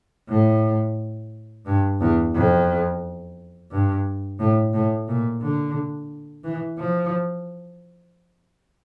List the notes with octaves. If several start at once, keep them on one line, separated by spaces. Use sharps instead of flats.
A2
G2
E2
F2
G2
A2
A2
A#2
D3
E3
F3